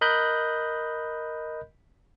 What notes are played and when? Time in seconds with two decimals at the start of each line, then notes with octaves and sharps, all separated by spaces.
0.01 A#4 D#5 B5 F#6 G6